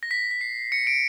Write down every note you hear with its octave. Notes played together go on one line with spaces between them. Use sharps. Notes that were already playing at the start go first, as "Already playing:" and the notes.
A#6
B6
B6
C7
C#7
D7